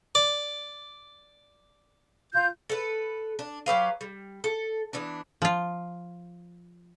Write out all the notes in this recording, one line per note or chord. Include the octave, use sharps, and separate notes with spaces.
D5
F4 G6
A4 B4
D4
F#3 G4 B4 F5
G3
A4
E3 B3 D4
F3 F4